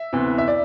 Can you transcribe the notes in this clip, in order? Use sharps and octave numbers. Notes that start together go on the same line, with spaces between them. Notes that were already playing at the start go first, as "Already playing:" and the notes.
Already playing: E5
D2 C3 E3 B3
E5
D5